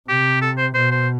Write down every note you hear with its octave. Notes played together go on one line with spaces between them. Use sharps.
C3 G4
A4
C5
B2 C5
C5